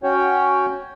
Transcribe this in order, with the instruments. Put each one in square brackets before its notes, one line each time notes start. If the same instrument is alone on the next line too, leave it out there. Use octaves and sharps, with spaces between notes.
[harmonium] C#4 F#4 C#5 G5